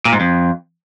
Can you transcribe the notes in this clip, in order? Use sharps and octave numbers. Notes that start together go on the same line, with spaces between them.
A#2
G#2
F2